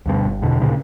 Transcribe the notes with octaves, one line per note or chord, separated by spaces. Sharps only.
D2 G2 B2
G1
E2 B2 D3
D2 A#2 C#3